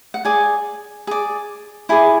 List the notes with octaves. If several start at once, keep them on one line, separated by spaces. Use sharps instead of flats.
F#5
G#4 D5 G#5
G#4 D5
E4 G#4 D5 G#5